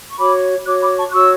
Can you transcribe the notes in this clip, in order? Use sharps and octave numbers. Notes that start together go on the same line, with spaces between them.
C#6
F#4 C#5 B5 D6
F#4 C#5 D6 F#6
B5 D6
A5 C#6
F#6
F#4 C#5 C#6 E6